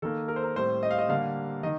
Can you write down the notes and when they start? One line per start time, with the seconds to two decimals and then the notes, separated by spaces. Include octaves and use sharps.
0.02 D#3 A#3 A4
0.28 A#4
0.36 C5
0.43 A#4
0.56 A2 G3 C4 C5
0.83 D#5
0.91 F5
0.98 D#5
1.09 D3 G3 A#3 F5
1.63 D#3 D#5